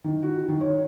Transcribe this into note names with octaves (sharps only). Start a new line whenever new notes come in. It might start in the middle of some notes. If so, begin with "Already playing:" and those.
D#3
F#4
D#3
C#5